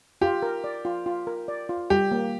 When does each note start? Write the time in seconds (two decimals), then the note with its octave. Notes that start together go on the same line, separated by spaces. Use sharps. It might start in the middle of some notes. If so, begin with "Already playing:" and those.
0.21 F4 G4
0.43 A#4
0.64 D5
0.85 F4
1.06 F4
1.27 A#4
1.48 D5
1.69 F4
1.90 G3 G4
2.11 A#3